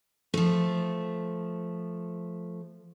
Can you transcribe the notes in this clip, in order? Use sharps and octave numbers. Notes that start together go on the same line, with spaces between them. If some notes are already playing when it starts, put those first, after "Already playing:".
F3 A3